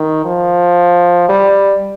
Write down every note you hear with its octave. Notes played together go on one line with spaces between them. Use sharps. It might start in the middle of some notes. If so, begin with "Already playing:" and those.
Already playing: D#3
F3
G3